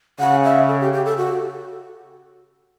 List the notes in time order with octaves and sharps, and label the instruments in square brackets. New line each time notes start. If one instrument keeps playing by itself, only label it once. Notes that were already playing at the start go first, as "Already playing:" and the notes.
[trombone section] C#3 [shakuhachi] F#5
[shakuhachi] E5
A4
G4
G4
A4
F#4